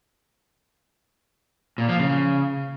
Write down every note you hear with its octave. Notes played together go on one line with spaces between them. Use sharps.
A#2
F3
C#3